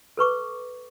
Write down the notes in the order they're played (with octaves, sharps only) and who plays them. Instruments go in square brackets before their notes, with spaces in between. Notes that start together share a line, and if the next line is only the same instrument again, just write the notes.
[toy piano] A4 B4 C#6 D6